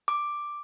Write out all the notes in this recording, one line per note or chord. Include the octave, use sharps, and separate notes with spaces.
D6